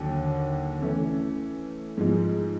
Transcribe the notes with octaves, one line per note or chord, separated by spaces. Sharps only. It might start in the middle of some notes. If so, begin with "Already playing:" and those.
Already playing: D#2 D3 F#3
E3 A3 C#4
G#2 F3 G#3